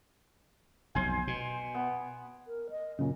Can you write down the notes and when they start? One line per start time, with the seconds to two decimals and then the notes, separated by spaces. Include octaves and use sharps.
0.95 F1 B1 C5 G#5
1.27 B2
1.74 B3
2.47 A#4
2.70 D#5
2.99 F#2 A#2 C#3 C#4